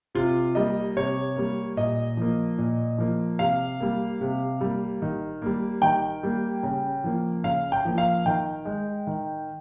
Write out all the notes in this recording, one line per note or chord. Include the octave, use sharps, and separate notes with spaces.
C3 F4
G3 A#3 D#5
C3 C#5
G3 A#3
A#2 D#5
F3 A#3
A#2
F3 A#3
C3 F5
G3 A#3
C3
G3 A#3
D#3
G3 A#3
D#3 G5
G3 A#3
C#3
F3 A#3
C#3 F5
G5
F3 A#3
F5
D#3 G5
G#3
D#3